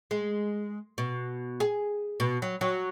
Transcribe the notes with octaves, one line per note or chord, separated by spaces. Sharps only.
G#3
B2
G#4
B2
F#3
F#3